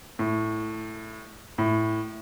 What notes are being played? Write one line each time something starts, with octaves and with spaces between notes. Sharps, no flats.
A2
A2